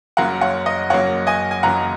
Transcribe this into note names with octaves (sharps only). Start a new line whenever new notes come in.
F#1 F#2 F#3 A#3 F#5 A#5
C#5 F#5
D#5
F#1 F#2 F#3 A#3 C#5 F#5
D#5 G#5
G#5
F#1 F#2 F#3 A#3 F#5 A#5